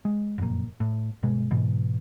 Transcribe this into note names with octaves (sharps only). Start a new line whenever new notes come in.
G#3
F#1 F2 A#2
A2
G1 B2 G#3
G#2 B2 E3